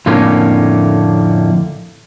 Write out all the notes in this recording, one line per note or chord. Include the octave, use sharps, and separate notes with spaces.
F2 A2 D3 A3 A#3 C#4